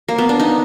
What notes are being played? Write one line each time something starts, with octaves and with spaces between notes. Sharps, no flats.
A#3
B3
D4
D#4